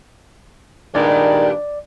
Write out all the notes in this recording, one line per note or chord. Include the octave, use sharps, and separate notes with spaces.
G2 A#2 D#3 G#3 D4 D5